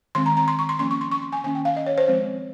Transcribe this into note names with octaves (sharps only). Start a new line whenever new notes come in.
D#3 G#3 C4 C6
A#5
A#5
C6
C#6
C6
F3 A#3 C#4 C6
C#6
C6
C#6
C6
G#5
D#3 A#3 C#4 G#5
G5
F5
D#5
C#5
C5
F3 G#3 C4